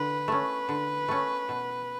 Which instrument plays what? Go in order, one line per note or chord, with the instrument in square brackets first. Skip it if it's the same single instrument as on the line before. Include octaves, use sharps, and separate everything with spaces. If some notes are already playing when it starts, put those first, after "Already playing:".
Already playing: [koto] D3 [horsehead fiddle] B4
[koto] A3 C#4
D3
A3 C#4
B2